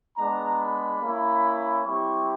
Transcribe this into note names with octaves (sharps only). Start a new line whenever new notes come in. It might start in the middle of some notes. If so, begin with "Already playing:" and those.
G#3 B3 D4 A#5
B5
A#3 C#4 E4
G3 C4 E4 G4 C#6